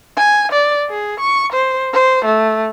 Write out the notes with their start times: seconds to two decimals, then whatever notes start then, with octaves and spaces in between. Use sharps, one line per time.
0.17 G#5
0.52 D5
0.90 G#4
1.20 C#6
1.52 C5
1.93 C5
2.25 A3